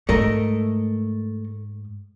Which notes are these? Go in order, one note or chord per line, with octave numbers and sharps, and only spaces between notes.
G#2 A3 A#4 D#5